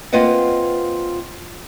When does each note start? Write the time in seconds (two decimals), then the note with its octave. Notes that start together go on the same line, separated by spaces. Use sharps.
0.13 A#3 C4 F4 B4 D#5 F#5